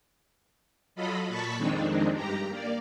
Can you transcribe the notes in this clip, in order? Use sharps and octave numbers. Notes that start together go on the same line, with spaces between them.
F#3 F4 A4 D#5 B5
A#2 A5 B5 C#6 B6
F2 D#3 G#3 C4 D4 D#4
G2 G4 A#5
A#3 D5